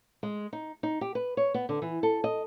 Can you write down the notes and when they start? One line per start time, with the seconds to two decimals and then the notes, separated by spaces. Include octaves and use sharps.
0.23 G#3
0.53 D#4
0.83 D#4
1.01 G4
1.15 B4
1.37 C#5
1.54 B3
1.69 D3
1.82 E3
2.03 A4
2.24 D#5